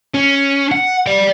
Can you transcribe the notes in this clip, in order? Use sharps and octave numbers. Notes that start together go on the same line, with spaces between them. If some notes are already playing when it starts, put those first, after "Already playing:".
C#4
F#5
D5 G5